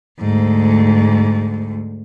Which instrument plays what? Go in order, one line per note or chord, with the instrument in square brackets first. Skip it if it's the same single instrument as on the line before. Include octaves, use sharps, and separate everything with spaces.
[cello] D2 G#2